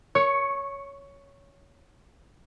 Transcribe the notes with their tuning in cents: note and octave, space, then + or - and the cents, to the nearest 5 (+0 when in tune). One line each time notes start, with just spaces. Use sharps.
C#5 +10 C#6 -10